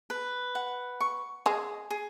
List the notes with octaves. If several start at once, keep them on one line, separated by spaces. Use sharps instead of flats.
B4
F#5
C#6
G#3 G#4
G#4